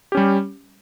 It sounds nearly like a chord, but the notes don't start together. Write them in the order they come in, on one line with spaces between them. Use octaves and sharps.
G4 C#4 G3